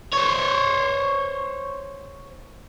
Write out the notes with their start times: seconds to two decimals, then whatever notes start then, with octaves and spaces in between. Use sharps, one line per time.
0.13 C5 C#5